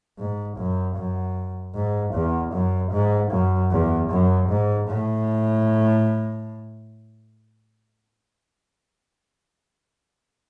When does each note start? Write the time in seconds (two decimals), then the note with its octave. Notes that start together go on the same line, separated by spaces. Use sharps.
0.18 G#2
0.57 F#2
0.96 F#2
1.75 G#2
2.14 E2
2.53 F#2
2.92 G#2
3.31 F#2
3.71 E2
4.10 F#2
4.49 G#2
4.88 A2